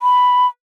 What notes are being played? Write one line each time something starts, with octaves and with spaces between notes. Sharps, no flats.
B5